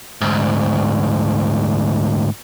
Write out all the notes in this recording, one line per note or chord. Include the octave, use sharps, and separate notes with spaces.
D2 G#2